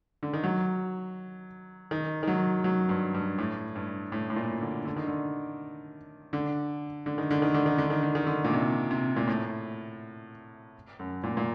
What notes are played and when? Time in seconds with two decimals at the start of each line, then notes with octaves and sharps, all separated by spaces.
0.23 D3
0.34 D#3
0.43 F#3
1.91 D#3
2.23 D#3
2.27 F#3
2.64 F#3
2.89 G2
3.14 G2
3.38 A2
3.75 G2
4.12 A2
4.30 A2
4.36 A#2
4.61 D3
4.86 D3
4.97 D#3
5.07 D3
6.33 D3
7.06 D3
7.18 D#3
7.31 D3
7.42 D#3
7.54 D3
7.66 D#3
7.78 D3
7.90 D#3
8.03 D3
8.15 D#3
8.26 D3
8.44 A#2
8.53 C3
8.91 C3
9.16 A#2
9.27 A2
10.99 F#2
11.23 A#2
11.37 A#2